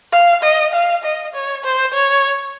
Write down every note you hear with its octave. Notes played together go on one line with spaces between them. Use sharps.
F5
D#5
F5
D#5
C#5
C5
C#5